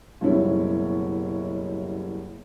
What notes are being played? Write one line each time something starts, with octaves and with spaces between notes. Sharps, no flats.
F#1 B2 G3 C#4 E4 C#5